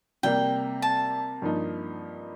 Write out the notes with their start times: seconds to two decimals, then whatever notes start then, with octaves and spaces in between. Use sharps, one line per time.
0.23 C3 G3 A#3 G5
0.82 A5
1.42 G2 F3 A#3 D#4